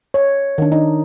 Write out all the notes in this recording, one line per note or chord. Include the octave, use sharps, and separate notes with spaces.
C#5
D#3 D4
D#4